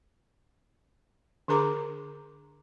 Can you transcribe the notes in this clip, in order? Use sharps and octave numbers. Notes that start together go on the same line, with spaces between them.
D3 D4 G#4 A#4 A#5 D6